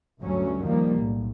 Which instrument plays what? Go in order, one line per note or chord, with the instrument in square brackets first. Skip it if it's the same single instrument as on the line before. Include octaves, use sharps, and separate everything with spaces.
[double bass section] D2 G2 F#3 C#4
D#3 F3 G3 A#3
B1 A2